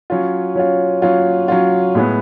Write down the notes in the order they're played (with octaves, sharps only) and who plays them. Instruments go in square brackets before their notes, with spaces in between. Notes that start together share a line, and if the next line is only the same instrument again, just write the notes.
[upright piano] F#3 C#4 F4
F#3 C#4 F4
F#3 C#4 F4
F#3 C#4 F4
A2 G#3 B3